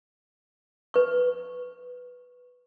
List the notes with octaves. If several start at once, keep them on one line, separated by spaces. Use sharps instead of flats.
B4 C#6